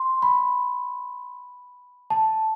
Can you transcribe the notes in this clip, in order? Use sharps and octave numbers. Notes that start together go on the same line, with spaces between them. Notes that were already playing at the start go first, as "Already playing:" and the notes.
Already playing: C6
B5
A5